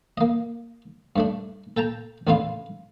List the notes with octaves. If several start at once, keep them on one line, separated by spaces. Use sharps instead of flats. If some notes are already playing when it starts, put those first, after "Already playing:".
A#3 D#5
G2 A3 D4
A4 G5 A5 A#5
A1 E2 D3 E4 F4 F5